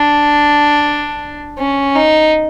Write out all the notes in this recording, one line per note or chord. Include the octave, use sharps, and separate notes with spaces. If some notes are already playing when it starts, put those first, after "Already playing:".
Already playing: D4
C#4
D#4